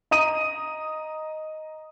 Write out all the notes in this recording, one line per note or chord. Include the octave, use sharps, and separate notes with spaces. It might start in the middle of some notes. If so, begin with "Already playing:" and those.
D#5 A#5 D#6 D#7